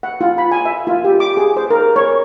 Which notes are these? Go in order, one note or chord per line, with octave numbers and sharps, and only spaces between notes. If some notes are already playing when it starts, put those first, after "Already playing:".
F#5
F4
B5
G#5
E5
F4
G4
D6
G#4
C5
A#4
C#5